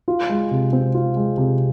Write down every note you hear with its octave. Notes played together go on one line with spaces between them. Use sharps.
F4
G#3
C3
C4
F4
G#3
C3